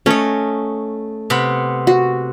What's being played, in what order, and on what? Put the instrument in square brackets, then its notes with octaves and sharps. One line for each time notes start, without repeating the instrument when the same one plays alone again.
[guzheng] A3 D#5 [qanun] C#4 C#5
[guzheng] C3 B3 B5
[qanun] F#4